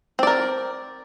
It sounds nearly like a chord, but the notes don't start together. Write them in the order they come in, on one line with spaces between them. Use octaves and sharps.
C4 D5 A#4